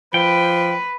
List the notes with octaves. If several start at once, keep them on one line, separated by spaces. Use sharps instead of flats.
F3 B4 G5